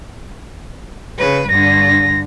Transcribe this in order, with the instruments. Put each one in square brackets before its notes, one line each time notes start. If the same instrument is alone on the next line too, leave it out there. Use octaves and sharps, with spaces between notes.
[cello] C#3 B4
[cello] G2 D3 [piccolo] A#6